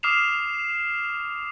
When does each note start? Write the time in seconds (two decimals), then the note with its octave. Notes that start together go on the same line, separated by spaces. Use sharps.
0.03 D6 D#6 F6 C7 E7 F7